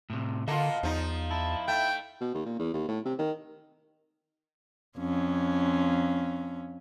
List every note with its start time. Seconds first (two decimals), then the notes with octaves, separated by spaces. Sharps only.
0.10 A2 C3
0.48 D3 A#3 F4 D#5 F#5 A5
0.83 E2 F3 D#4
1.31 E4 A5
1.68 A3 G5
2.21 B2
2.34 D#2
2.46 A#2
2.59 E2
2.74 D#2
2.88 A2
3.05 C3
3.19 D#3
4.98 F2 C#4